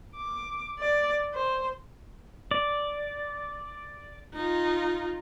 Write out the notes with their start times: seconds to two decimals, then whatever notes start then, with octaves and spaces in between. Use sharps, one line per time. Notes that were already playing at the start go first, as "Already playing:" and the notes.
0.16 D6
0.79 D5
1.34 C5
2.51 D5
4.34 D#4 F4